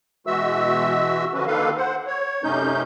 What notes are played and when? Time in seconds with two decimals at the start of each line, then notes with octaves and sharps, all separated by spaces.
0.27 B2 E3 G#3 F#4 E5 E6
1.34 D3 F3 C#4 F#4 B4
1.47 D3 D#3 A#3 A4 B4 F5
1.77 C5 F#5
2.07 C#5
2.44 F#2 C3 A3 C#4 D#4 G6